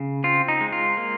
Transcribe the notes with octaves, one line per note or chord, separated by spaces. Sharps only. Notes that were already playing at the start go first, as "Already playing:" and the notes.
Already playing: C#3
C4 F4
D#4
G#3
F4
A#3